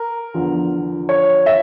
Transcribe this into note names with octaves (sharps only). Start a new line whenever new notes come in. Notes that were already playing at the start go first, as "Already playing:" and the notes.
Already playing: A#4
E2 D3 F3
C#5
E5